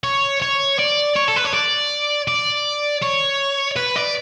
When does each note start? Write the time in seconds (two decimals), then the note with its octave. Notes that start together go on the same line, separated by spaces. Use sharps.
0.04 C#5
0.42 C#5
0.79 D5
1.16 C#5
1.28 A4
1.36 B4
1.45 C#5
1.54 D5
2.28 D5
3.02 C#5
3.76 B4
3.96 D5